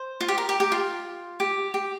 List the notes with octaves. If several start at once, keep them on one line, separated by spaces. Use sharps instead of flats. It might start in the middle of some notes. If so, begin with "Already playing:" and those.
Already playing: C5
F4
G4
A#4
G4
G4
F4
G4
G4